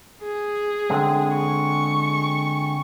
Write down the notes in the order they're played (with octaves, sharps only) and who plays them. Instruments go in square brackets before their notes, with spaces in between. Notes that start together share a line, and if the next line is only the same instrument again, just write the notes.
[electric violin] G#4
[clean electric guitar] D3 G#3 C4
[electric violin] C#6